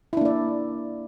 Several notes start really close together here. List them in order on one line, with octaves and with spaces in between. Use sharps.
E4 D4 A#3 D5